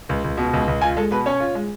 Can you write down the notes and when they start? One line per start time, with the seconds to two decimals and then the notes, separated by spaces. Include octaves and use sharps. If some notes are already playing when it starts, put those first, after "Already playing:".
0.09 C#2
0.24 C#2
0.38 B2
0.53 C#2
0.68 C#2
0.81 F4 G#5
0.97 G#3 A4
1.11 B2 B4
1.26 C#4 C#5
1.40 F4
1.55 G#3